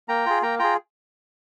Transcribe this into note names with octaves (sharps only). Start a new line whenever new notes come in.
A#3 G5 A#5
F4 G#4
A#3 G5 A#5
F4 G#4 G5 A#5